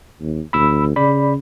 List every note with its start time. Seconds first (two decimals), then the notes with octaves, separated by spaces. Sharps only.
0.21 D#2
0.53 D2 B5 E6
0.96 C#3 D5 B5